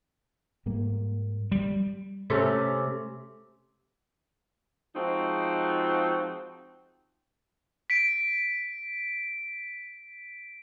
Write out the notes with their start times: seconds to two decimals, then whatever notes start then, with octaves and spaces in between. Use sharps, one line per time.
0.66 G#2 G3 A#3
1.52 G3
2.30 C3 A3 C#4
4.95 F3 G#3 C4 D#4 F#4
7.90 B6 D7